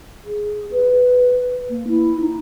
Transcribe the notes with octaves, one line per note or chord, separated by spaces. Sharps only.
G#4
B4
A#3
E4
D#4